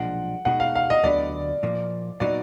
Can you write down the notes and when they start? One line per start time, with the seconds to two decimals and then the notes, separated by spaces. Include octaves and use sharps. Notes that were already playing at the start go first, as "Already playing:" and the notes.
Already playing: B1 A#2 F3 G#3 D4 F#5
0.45 B2 G#3 D#4 F#4 F#5
0.60 F5
0.75 F5
0.90 D#5
1.04 D2 D3 F#3 B3 D5
1.63 A#2 F3 A#3
2.20 A#2 F#3 B3 D#4 F#4 D5